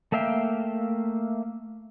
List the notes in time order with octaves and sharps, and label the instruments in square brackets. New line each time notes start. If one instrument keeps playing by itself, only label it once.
[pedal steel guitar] A3 A#3 E5 F5 G5